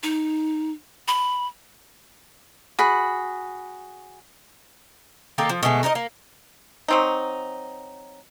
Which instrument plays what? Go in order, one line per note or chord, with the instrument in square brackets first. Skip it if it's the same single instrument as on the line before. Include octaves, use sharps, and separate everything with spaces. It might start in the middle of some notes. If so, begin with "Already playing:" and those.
[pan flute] D#4
B5
[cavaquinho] F#4 G#4 B5
[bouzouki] D#3 A#3 G4 A4
F3
B2 D3 G#3 A3
D#4 A#4 C5 D#5
A#3
[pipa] F#3 C4 D#4